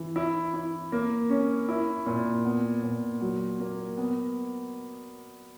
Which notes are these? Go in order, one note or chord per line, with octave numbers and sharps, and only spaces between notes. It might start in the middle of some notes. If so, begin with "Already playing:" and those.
Already playing: E3
E4
E4
A#3
C#4
E4
A#2
B3
A#2
F#3
A#3
B3